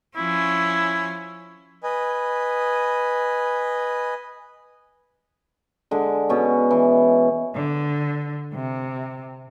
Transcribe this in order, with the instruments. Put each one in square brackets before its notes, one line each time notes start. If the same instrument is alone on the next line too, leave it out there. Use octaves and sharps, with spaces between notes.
[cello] F3 C#4 [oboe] E4
[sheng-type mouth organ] B4 D#5 G#5
[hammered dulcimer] D3 G#3
B2 C#4
E3
[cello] D3
C3